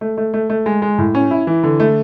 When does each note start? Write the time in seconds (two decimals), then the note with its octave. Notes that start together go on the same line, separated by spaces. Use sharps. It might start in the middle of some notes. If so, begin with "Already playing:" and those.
0.01 A3
0.17 A3
0.34 A3
0.50 A3
0.66 G#3
0.82 G#3
0.98 A2
1.15 C#4
1.31 E4
1.47 E3
1.63 D3
1.80 A3